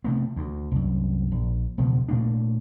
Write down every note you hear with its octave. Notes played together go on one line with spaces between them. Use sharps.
C3 A3 B3
D2
C2 F#2
A#1
E1 C#2 B2 F3
A#2 A3 A#3 D4